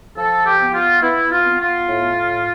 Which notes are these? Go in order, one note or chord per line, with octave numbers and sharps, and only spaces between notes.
F3 A4
G4
B3
F4
B3 E4
F4
B3
F4
A2